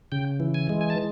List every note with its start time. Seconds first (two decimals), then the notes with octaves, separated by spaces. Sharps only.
0.12 C#3 G5
0.40 E3
0.54 G#5
0.69 G#3
0.81 G#5
0.90 A5